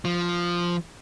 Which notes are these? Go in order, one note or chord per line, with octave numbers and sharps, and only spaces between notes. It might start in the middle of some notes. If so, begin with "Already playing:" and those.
F3